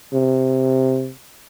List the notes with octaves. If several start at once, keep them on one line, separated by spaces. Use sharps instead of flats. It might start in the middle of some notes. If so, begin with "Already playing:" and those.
C3